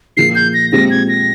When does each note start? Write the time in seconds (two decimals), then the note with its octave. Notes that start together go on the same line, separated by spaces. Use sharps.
0.17 A#2 F3 A#3 F4 G#4 C7
0.35 G6
0.54 A#6
0.72 A#2 G#3 C4 G4 A#6
0.91 G#6
1.08 A#6